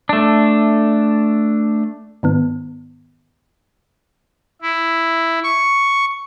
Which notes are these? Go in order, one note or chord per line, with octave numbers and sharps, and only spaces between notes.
A3 D4
G#2 D#3 B3
E4
C#6